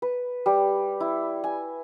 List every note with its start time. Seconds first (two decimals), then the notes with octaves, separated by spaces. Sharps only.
0.02 B4
0.46 G3
1.00 E4
1.44 G#5